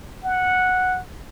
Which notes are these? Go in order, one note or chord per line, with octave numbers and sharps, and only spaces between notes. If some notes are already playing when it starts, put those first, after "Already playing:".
F#5